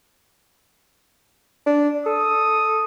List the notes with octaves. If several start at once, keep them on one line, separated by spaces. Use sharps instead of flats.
D4
A4 D#6